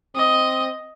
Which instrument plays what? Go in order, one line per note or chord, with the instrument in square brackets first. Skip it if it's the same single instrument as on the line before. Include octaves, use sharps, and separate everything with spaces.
[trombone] C4 [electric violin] D#5